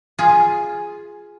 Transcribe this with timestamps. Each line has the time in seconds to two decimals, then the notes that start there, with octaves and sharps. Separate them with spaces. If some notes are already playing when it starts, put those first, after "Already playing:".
0.19 F4 G#4